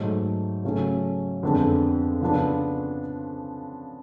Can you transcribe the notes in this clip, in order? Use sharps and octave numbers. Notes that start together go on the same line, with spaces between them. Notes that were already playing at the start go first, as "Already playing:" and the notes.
Already playing: G#2 F#3 A3
C#3 F#3 A3 C#4
F2 D3 G#3 B3 D4
C#3 F3 B3 D4